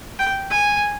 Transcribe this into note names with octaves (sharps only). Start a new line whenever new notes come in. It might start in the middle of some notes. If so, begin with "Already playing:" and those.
G5
G#5